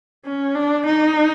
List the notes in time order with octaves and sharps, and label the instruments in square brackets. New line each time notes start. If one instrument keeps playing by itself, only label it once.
[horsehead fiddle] C#4
D4
D#4